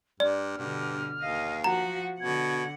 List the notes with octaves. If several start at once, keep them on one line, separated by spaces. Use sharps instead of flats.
G2 D5 F6
G2 B2 D3
D#2 D#5 F5
F3 F#4 F#5 A#5
B2 D3 F#5 G#6